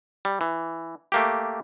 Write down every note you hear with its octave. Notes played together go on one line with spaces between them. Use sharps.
G3
E3
A3 A#3 G4